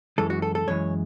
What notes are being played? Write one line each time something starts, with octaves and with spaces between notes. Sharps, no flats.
F#2 E3 G#3 A4
F#4
A4
A4
F#2 E3 G#3 C#5